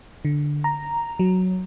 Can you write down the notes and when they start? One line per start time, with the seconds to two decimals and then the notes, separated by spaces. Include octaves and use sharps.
0.25 D3
0.64 A#5
1.19 F#3